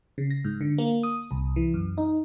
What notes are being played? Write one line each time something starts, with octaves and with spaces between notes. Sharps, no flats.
C#3
A#6
G#2
D3
A#3
D#6
C2
E3
F#2
D#4